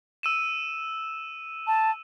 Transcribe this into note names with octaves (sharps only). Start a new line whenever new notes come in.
E6 D#7 E7
A5